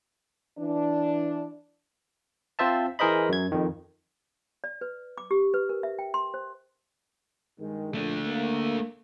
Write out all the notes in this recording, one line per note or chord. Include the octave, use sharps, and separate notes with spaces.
E3 D4
C4 F4 C5 E5 A5
E3 G#4 A#4 C5 D#5 B5
F#2 G#6
F2 D#3
D5
B4
D6
G4
B4
A#4
E5
G5
C6
C5
G2 D#3 G#3
A#1 A3 D4
A#3